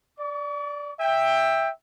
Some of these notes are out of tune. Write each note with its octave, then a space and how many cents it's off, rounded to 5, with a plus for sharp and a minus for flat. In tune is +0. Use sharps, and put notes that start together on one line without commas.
D5 -5 C#6 +45
E5 +0 G5 +15